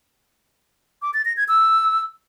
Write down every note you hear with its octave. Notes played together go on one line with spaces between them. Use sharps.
D6
A6
A#6
G#6
E6